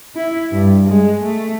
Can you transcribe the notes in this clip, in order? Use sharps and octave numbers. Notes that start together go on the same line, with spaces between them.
E4
G2
G#3
A3